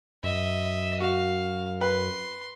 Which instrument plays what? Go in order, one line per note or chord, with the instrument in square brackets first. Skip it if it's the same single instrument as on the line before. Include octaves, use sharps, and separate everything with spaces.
[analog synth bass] F#2 [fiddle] D#5 E5
[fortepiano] F#4 [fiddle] F5
[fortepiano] B4 [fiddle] C6